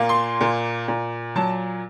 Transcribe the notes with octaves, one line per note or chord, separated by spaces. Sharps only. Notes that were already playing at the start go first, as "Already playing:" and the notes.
Already playing: A#2 A#3
C6
A#2
A#2
F#3 A5